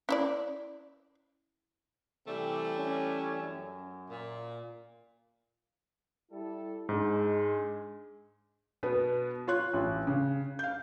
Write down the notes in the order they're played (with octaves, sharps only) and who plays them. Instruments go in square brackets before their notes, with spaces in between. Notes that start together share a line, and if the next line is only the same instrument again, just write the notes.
[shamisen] C#4 E4 D5
[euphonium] C3 [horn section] E3 G3 A3
[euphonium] C#4
F#2
[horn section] A#2
[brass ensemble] G3 E4 A4
[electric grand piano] G#2 D4 [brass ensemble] G#3
[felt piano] B2 B3 B4
F4 C#5 C6 F#6
A1
C#3
F5 G6